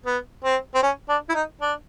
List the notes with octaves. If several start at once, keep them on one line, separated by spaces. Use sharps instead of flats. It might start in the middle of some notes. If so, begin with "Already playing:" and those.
B3
C4
C4
C#4
D4
E4
D#4
D4